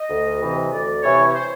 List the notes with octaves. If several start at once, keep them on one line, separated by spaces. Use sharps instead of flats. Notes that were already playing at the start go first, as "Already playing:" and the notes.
Already playing: D#5
D2
C3 E3
D2 D5
C3 E3 C#5
C#5
C5